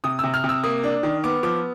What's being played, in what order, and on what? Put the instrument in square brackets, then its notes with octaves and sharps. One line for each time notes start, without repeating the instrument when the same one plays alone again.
[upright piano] C3 D#6
C3 E6
F6
C3
E6
A#3 D#6
D4
D#3
B3 D6
F3 D6